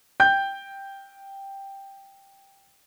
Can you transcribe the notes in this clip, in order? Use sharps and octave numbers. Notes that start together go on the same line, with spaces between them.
G5 G6